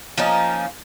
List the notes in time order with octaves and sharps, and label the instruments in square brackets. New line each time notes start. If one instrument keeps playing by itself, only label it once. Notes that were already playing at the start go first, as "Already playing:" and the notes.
[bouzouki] F3 A#3 C#4 D#4